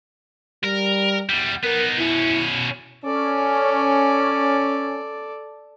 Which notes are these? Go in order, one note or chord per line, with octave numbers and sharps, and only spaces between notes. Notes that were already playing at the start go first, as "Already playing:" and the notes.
G3 A#4
E2 G3
B3 D#4 A#4
B2 C#4 E4
C#4 A4 D5